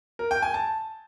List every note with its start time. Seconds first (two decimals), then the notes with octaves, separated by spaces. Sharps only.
0.19 A#4
0.31 G5
0.42 G#5
0.54 A5